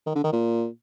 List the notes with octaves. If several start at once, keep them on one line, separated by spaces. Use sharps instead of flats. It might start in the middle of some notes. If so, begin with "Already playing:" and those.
D#3
D3
D#3
A#2